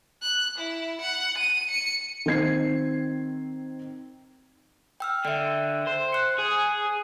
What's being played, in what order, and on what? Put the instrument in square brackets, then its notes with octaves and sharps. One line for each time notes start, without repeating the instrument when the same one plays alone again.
[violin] F#6
E4
F#5
D#7
C#7
[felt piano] D#3 C4 G#6 C7
[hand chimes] G5 E6 F6
[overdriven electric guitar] D3 [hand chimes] E5 G5
[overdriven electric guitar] C5
[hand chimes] F#6 C#7
[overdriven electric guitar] G#4